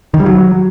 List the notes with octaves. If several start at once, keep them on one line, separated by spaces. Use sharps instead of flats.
D#3
G3
F#3